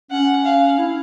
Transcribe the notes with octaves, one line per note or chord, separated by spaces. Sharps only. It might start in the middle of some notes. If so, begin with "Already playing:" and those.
C#4 F#5
F5
E4